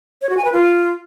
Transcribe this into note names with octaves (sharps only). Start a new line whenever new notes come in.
C#5
F#4
G#5
B4
F4